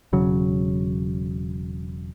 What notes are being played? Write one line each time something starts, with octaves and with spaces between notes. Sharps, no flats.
E1 C#3 F#3